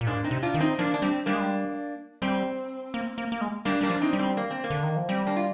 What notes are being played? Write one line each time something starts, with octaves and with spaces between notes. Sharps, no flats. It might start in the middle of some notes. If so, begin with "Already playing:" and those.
A#2
G#2 A#3 D4
C4 D#4
C3
D4 F4
D#3
C4 D#4
F3 A#3 D4
D4
G3 C4
G3 A#3 D4
G#3
G3
G3 C4
A#3
A#3
A#3
G#3
G3 A#3 D4
G3 A#3 D4
F3
C4 D#4
G3
C4
A#3
C4
A#3
D3
D#3
F3
G3 C4
A#3 D4
F4